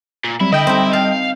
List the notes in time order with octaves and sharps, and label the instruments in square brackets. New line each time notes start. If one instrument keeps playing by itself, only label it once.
[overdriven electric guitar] A#2
[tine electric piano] F#3 G3 C4 [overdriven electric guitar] E4
[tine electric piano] D3 [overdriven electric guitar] E4 [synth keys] D#5 G5
[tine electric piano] G3 [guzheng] C4 D#4
[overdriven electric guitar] F5 [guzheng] A5